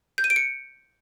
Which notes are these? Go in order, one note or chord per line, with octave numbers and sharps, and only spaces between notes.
G6
D#7
D7
C#7